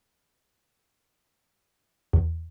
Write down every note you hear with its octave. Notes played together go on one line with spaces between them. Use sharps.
E2